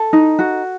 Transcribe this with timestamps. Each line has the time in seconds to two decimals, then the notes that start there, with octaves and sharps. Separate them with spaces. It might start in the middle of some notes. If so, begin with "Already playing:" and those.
Already playing: A4
0.13 D#4
0.39 F#4